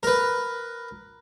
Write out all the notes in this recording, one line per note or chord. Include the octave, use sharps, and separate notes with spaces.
A#4 B4